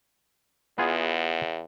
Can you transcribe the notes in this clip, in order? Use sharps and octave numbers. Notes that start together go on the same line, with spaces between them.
E2 B3 F4 G#4